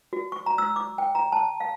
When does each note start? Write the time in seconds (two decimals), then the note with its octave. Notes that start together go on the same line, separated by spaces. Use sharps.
0.13 F#4
0.32 C#6
0.46 A#5
0.58 E6
0.76 D6
0.98 G5
1.15 A#5
1.32 A5
1.60 F5